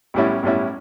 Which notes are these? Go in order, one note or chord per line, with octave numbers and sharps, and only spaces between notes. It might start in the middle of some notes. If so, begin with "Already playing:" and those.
B1 A2 G3 C#4 E4
B1 A2 G3 C#4 E4